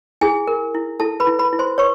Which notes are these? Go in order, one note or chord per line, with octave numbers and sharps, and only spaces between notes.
E4 G#4 G#5
A#4
E4
E4 A4 A5
B4 B5
E4
B4 B5
E4
C5 C6
B4 C#5 C#6